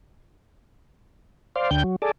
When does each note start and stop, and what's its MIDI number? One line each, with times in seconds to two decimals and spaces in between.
1.56 1.70 72
1.56 1.70 74
1.56 1.70 77
1.71 1.83 38
1.71 1.83 50
1.71 1.83 79
1.71 1.83 91
1.84 1.96 54
2.02 2.11 68
2.02 2.11 69
2.02 2.11 74